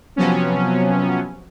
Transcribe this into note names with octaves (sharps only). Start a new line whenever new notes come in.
C3 F3 F#3 B3 C#4